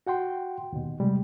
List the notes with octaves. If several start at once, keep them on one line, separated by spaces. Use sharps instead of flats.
F#4 F#5 G5 C6
D#2 B2
C3 G3 G#3